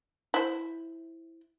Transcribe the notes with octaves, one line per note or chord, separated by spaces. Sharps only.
E4 C5